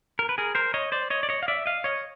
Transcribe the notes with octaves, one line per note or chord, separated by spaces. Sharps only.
A#4
B4
G#4 A#4
A#4 C5
C#5 D#5
C5 D5
C#5 D#5
D5
C#5 D#5
F5
D5 E5
D#5 F5
C#5 D#5